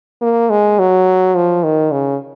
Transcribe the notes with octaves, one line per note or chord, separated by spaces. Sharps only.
A#3
G#3
F#3
F3
D#3
C#3